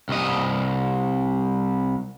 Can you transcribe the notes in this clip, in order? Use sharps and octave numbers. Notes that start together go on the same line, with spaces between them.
C2 D#5